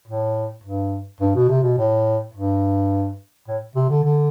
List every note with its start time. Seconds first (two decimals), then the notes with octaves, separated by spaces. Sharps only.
0.08 A2
0.64 G2
1.21 G2
1.35 B2
1.49 C3
1.63 B2
1.78 A2
2.34 G2
3.48 A2
3.76 C3
3.90 D3
4.04 D3